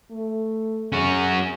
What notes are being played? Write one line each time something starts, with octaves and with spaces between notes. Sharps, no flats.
A3
C#4 F#4 G#4